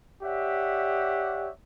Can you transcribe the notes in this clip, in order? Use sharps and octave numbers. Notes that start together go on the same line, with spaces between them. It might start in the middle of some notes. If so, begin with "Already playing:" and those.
G4 C#5 D5 E5 F#5